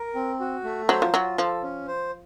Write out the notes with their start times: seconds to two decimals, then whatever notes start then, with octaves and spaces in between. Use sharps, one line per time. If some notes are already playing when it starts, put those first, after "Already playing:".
Already playing: A#4
0.15 C4
0.40 F#4
0.64 A3
0.89 F#3 C5
1.02 F3
1.14 F#3 F4
1.38 F3 A4
1.63 C#4
1.88 C5